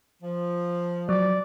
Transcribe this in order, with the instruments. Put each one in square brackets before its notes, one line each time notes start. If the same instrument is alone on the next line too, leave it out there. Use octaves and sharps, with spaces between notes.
[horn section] F3
[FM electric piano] F#3 [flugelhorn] D5